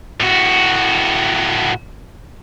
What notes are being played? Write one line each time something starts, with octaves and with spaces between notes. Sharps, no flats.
A2 F#4